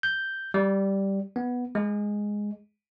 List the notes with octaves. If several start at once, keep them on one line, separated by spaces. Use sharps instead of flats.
G6
G3
B3
G#3